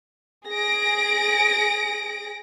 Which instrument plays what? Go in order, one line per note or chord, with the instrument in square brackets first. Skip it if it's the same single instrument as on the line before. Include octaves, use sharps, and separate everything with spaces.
[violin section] G#4 A#6 D7